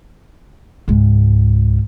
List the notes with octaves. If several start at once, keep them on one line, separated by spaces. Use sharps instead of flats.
C#2 G#2